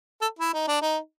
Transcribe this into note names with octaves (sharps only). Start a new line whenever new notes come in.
A4
E4
D#4
D4
D#4